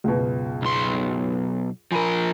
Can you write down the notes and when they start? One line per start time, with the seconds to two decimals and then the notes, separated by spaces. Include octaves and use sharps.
0.04 C#2 F#2 B2
0.62 B1 C6
1.92 F3 A#4 G#5 B5 D#7